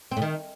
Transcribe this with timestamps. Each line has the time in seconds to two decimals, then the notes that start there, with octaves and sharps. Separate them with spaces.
0.11 C4
0.17 A2
0.22 D#3